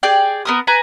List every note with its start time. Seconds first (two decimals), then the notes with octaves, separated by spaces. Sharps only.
0.03 G#4 D5 G5
0.45 B3 A#4 D#6
0.67 B4 G#5 A#5